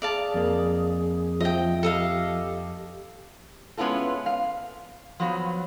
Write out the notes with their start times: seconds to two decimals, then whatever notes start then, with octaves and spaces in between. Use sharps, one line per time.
0.02 G#4 D5 F5 A5
0.34 F2 A#3
1.41 F3 D#5 E5 G5
1.83 G4 A4 D#5 F5
3.77 G#3 B3 C#4 E4 F4 A4
4.26 F5
5.20 F3 F#3 B3